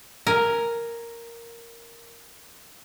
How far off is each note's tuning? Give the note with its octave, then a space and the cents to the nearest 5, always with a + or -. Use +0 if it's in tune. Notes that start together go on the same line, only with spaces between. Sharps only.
A#4 +0 G#5 +0